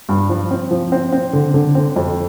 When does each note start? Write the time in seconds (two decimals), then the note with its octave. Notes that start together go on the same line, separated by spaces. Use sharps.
0.09 G2
0.29 F3
0.51 C4
0.71 F3
0.92 C4
1.13 C4
1.33 D3
1.54 D3
1.75 C4
1.96 F2